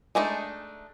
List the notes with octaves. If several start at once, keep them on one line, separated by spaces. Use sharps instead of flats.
G#3 A3 D4 D#4